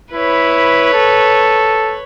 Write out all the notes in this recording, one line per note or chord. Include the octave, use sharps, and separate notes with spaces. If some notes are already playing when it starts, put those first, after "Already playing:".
E4 B4 C#5
A4